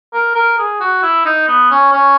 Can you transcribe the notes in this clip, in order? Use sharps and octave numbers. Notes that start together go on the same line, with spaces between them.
A#4
A#4
G#4
F#4
E4
D#4
B3
C#4
C#4